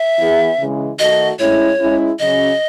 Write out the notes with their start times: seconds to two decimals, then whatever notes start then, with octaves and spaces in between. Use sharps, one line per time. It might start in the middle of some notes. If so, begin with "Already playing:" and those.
Already playing: E5
0.19 E3 B3 E4 G#4
0.59 C#3 E3 G#3
0.99 D#3 A3 D#4 F#4 D#5
1.39 A2 G#3 C#4 E4 C#5
1.79 G#3 C#4 E4
2.19 C#3 F#3 C#4 D#5